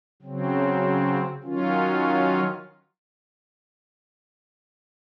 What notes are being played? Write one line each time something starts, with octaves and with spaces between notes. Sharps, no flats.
C#3 F#3 C4
D#3 F#3 C#4 F4